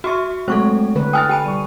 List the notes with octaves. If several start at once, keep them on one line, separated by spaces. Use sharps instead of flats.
F#4 E5 C6 C#6
F#3 G#3 A3 C4 A4 C5 C#6
D3 B4
G5 G#5 D#6 F6 A6
G4 G5 G#5 B5 D#7
G3 C#6